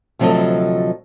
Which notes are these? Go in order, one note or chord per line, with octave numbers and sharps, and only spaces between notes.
D2 C3 F3 F#3 A4 D#5